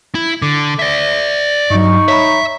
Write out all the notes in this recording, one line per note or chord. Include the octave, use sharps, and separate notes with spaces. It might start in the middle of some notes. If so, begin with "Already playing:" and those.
E4
D3 D6
D5 E5
G2 F#3 D#4 C#6
C#5 E5 A#5 B5